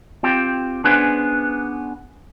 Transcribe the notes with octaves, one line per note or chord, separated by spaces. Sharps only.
C4 F4 G4
B3 C#4 D4 G#4 B4 C5